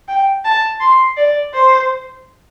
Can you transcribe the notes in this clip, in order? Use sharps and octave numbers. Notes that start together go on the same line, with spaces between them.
G5
A5
C6
D5
C5